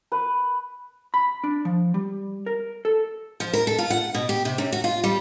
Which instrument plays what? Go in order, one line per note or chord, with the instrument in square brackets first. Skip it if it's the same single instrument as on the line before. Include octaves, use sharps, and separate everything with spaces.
[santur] B4
[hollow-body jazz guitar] B5
D4
F3
G3
A#4
A4
[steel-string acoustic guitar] F3
A#4
A4
F4
F#5
B2
G4
C3
F#2
F#4
F4
G3